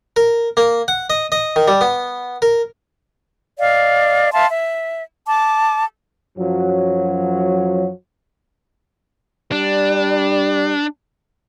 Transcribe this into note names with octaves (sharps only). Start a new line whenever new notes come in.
A#4
A#3
F#5
D#5
D#5
D#3
G3
B3
A#4
D5 D#5 F5
E5 F5 A5 C6
E5
A5 D6
F#2 F3 F#3
G3 D4